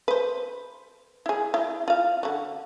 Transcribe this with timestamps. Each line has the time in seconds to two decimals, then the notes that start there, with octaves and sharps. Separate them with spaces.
0.08 B4 C5
1.26 E4 G#4
1.54 E4
1.88 F4 F5
2.23 D3 F#4